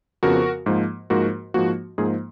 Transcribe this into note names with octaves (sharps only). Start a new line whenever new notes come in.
F2 C#3 F3 B3 F#4 A#4
G#2 F3 A#3
G#2 F3 A#3 F#4 A#4
G#2 F3 A#3 F#4
G#2 F3 A#3 G#4